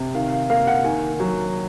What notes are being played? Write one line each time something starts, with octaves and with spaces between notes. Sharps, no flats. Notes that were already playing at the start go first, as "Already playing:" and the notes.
Already playing: C3
D#3 F5
F5
A#3 F5
F#5
D#3 G#5
F#3